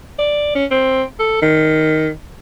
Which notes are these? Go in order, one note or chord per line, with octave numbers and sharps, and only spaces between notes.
D5
C#4
C4
A4
D#3